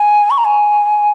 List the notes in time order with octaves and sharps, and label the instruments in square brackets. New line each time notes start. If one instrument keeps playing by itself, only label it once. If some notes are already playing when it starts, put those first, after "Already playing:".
Already playing: [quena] G#5
C#6
A#5
G#5